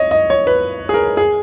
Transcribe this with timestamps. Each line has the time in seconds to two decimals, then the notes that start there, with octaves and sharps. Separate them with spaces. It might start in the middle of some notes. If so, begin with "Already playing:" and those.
Already playing: C#5 D#5
0.11 D#5
0.30 C#5
0.47 B4
0.89 G#4
0.94 A#4
1.17 G#4